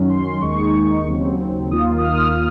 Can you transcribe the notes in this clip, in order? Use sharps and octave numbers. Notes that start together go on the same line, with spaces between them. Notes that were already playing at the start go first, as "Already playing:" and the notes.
Already playing: F#2 D#3 F#3 C#4
C6
D#2 D#3 G#3 D#4 C#6
D#2 C#3 F#3 C4
D#2 D#3 A#3 F4 D#6
D#6
F6